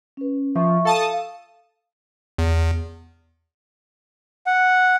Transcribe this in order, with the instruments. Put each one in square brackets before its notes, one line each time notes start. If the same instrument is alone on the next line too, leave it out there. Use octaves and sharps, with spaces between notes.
[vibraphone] C#4 B4
[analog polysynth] F3 [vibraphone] E5 C#6
[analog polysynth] A4 A5 D#6 [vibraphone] F5
[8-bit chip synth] E2
[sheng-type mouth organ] F#5